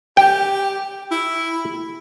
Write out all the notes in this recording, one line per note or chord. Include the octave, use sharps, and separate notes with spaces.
G4 G5
E4